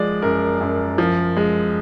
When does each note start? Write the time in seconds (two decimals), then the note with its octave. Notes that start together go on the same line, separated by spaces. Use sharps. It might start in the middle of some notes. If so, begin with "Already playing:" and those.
Already playing: F3 G#3 D5
0.22 F#2 A#4
0.61 F#2
0.98 F3
1.37 G#3